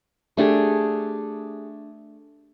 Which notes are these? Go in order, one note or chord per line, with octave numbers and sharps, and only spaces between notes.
A3 D4 G4 G#4